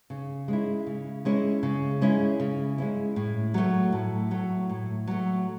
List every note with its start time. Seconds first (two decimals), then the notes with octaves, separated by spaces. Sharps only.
0.10 C#3
0.48 G#3 C#4 E4
0.87 C#3
1.25 G#3 C#4 E4
1.63 C#3
2.01 G#3 C#4 E4
2.40 C#3
2.78 G#3 C#4 E4
3.16 A2
3.54 F#3 A3
3.92 A2
4.31 F#3 A3
4.69 A2
5.07 F#3 A3